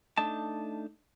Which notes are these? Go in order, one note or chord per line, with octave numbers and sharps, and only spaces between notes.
A3 D4 D#4 A5